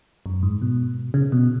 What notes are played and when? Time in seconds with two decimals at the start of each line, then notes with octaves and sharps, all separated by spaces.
0.26 F#2
0.43 G#2
0.62 B2
1.14 C#3
1.32 B2